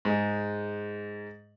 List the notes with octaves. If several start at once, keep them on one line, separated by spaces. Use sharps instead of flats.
G#2 G#3